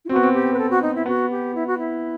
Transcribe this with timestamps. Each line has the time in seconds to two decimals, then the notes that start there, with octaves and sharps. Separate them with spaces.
0.04 E4
0.09 C4 F#4
0.16 B3
0.23 C4
0.33 G4
0.53 B4
0.58 A4
0.70 F#4
0.82 D#4
0.94 E4
1.06 B3 F#4
1.30 G4
1.54 E4
1.66 F#4
1.78 E4